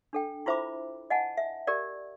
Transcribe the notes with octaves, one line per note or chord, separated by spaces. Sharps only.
D4 A4 G5
E4 F4 C5 E5 B5 D6
D#5 F#5 G#5 A5
E5
G4 A#4 D5